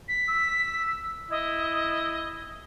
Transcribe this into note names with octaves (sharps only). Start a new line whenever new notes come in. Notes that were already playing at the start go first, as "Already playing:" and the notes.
B6
E6
E4 D#5